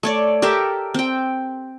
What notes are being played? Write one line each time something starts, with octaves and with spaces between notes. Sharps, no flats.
A3 C#5 D5
G4 A4 A#4 E5
C4 G5